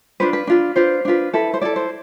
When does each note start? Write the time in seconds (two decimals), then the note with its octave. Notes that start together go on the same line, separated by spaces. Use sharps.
0.20 D4 F4 B4 C5
0.33 B4
0.47 D4 F4 B4
0.76 D4 F4 B4 C5
1.05 D4 F4 B4
1.34 E4 A4 B4
1.54 C5
1.62 E4 A4 D5
1.76 C5